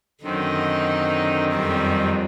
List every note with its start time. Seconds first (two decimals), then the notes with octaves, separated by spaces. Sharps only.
0.24 F#2 D3 D#3 C4 D#4
1.54 F2 F3 G3